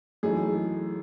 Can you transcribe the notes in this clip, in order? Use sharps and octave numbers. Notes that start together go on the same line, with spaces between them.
F#2 E3 A3 D#4 G#4